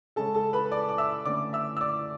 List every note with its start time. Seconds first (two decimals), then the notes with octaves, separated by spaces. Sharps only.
0.16 C#3 G#3 C#4 A4 A5
0.34 A4 A5
0.53 B4 B5
0.71 D5 D6
0.89 D6
0.98 E5 E6
1.25 D3 A3 C#4 D5 D6
1.53 E5 E6
1.77 E6
1.81 D5 D6